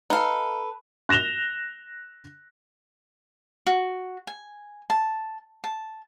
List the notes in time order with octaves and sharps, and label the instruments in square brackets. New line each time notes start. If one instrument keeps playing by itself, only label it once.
[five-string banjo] D#4 F5 [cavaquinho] A4 B4
[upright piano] F#6 A#6 E7 F7 G7
[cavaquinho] F#4
G#5
A5
A5